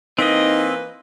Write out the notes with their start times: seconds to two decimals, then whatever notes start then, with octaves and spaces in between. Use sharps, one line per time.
0.19 E3 A#3 C4 D#4 B4 D#5